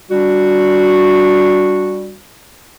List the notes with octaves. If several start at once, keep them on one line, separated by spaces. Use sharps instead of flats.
G3 D4 F#4